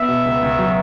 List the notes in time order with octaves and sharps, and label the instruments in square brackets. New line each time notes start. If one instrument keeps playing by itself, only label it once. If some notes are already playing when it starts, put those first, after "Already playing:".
Already playing: [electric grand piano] B3 [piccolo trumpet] E5
[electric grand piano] B2
C#2
C#2
F#3